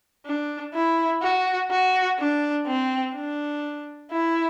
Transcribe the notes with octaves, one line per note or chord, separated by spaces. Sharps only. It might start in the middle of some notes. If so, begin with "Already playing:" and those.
D4
E4
F#4
F#4
D4
C4
D4
E4